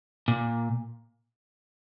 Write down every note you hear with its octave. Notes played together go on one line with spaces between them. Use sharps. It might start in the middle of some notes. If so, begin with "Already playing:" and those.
A#2